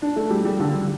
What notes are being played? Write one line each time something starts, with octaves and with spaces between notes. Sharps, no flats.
D4
A3
G3
G3
D3
G3